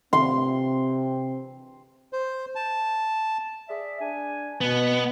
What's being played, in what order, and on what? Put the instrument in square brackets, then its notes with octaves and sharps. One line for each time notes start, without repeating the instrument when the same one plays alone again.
[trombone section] C3 C4 [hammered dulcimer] C6
[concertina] C5
A5
[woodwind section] G#4 D5 E5
D4 G#5
[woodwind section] B2 [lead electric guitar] B3